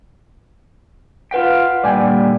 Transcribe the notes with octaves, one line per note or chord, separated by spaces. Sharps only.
F4 B4 F#5 G5 B6
A#2 D3 G3 D5 G5 G#5